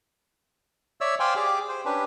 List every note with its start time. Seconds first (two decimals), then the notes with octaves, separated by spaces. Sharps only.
1.01 C#5 D5 E5 E6
1.20 C5 D5 F5 G5 G#5 C6
1.36 G4 G#4 D6
1.69 C5
1.85 C#4 D4 G4 B4